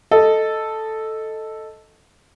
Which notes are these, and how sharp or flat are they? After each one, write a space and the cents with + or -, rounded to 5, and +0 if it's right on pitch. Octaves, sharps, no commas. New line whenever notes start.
A4 +0 D#5 +0